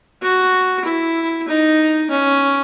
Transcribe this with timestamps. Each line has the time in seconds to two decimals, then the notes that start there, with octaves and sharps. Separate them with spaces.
0.22 F#4
0.84 E4
1.48 D#4
2.10 C#4